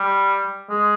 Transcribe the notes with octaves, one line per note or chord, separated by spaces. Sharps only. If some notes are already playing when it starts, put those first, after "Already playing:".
Already playing: G3
G#3